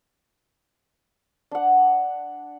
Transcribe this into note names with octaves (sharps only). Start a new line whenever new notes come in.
D4 F#5